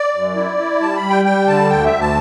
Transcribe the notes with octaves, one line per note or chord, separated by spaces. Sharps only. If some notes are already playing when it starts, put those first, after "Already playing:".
Already playing: D5
F#2
E4
E4
G3 A5
B5
G3
G5
G3 G5
D3 A5
D2 G5
E5
D2
A5